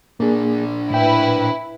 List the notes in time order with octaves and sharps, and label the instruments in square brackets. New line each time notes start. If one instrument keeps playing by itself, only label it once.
[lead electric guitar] A#2 D4 [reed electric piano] A#3 G#4
[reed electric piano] A2 G5 [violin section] E4 B4